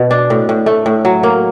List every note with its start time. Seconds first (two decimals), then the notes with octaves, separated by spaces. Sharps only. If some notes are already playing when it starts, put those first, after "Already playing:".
Already playing: B2
0.11 D4
0.30 A2
0.49 A2
0.66 A3
0.86 A2
1.05 F#3
1.23 A#3